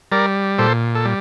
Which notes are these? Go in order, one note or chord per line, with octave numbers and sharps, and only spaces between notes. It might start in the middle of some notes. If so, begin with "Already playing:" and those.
G3 A#4 D5
A#2 A4 C5
A4
G3